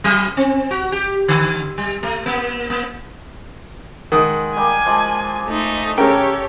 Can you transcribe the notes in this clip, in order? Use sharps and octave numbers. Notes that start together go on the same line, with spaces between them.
F#3
C4
F#4
G4
D3
G3
A3
A#3
A#3
D#3 G#3 F#5 D#6
G3 A#3 G4 G#5
F3 G#3 D5
A3 D#4
C#3 G4 A4 A#4 C#5 E5 G5